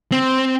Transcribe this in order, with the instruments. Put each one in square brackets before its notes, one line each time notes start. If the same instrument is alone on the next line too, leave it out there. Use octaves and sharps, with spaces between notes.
[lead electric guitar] C4